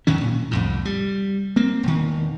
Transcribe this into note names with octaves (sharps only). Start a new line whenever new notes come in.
E2 D#3 F#3 C#4
A#2
C2 F2 A2
G3
A#3 C4
E1 D#3